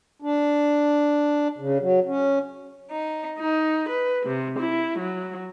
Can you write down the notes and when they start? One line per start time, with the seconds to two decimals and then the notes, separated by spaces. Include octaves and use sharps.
0.22 D4
1.58 C#3
1.81 F#3
2.06 C#4
2.91 D#4
3.38 D#4
3.89 B4
4.26 C3
4.59 E4
4.99 F#3